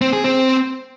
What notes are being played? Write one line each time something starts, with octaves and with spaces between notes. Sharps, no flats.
C4
G#4
C4